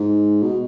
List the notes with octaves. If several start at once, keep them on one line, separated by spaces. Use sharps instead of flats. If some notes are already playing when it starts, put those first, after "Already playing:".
Already playing: G#2
B2